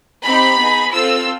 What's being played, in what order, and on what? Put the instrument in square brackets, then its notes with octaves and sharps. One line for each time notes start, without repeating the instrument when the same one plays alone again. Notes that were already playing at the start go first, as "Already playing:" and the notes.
[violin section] C4 D#4 G4 B5
B3 D#4 G#4
C4 F4 A4 E6